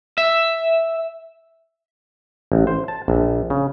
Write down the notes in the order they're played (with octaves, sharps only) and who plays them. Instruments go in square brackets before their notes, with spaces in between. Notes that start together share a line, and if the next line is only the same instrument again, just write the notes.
[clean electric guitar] E5
[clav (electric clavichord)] A1
C5
A5
A#1
C#3